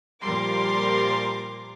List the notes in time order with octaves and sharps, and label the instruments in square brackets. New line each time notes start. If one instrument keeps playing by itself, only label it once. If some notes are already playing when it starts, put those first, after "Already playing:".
[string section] A#2 F3 G3 A#4 C6 D6